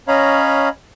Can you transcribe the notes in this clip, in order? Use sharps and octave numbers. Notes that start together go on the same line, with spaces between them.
C#4 C#5 D#5 F5 A#5 B5